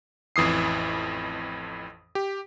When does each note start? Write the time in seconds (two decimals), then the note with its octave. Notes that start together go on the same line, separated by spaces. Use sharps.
0.36 A1 F2 E3 D#6 C7
2.15 G4